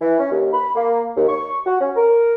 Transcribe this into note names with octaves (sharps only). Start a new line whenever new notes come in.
E3
C#4
D#2
B5
A#3
D#2
C#6
F#4
C#4
A#4